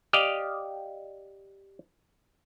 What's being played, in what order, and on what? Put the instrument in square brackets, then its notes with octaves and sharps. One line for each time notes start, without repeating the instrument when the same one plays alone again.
[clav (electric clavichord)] G4 D5 D#5 F5